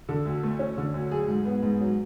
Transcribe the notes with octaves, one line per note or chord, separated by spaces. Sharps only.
D3 A4
D2
A3
C#4
D3
D2
F#3 G#4
G#2
B3
G#2
F#3